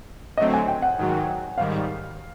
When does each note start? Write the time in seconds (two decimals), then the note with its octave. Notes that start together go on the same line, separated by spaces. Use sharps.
0.37 D3 F#3 A3 C4 D#5
0.54 G#5
0.68 G5
0.82 F#5
0.98 G#2 D#3 F#3
1.57 G#2 D#3 G3 F5